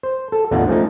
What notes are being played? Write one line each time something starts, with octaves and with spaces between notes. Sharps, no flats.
C5
A4
A1 E2 D3 D#4 F4 F#5
F3 A3 C#4 D#4